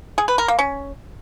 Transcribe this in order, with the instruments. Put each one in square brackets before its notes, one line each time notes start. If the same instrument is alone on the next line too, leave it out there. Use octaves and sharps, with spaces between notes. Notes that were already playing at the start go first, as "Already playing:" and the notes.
[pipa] G#4
B4
A#4
A#3
C#4